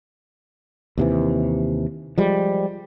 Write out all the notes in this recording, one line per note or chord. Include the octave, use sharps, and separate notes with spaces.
D#2 C3 E3
F3 G3 G#3